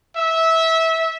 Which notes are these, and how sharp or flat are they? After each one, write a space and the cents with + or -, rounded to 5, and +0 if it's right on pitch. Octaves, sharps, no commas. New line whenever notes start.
E5 -20